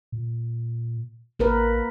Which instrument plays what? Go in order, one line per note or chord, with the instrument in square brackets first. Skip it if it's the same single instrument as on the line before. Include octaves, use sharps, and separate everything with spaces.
[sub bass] A#2
[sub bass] A1 [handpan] A#3 A#4 B4